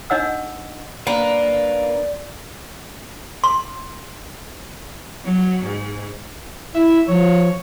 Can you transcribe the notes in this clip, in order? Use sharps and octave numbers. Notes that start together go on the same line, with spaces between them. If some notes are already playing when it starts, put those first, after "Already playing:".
D4 D#4 D#5 F#5 E6
A#3 D4 B4 D5
C6
F#3
G#2
E4 E5
F3 C#5